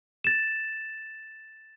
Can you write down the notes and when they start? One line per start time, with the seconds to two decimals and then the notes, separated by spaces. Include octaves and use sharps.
0.24 A6 E7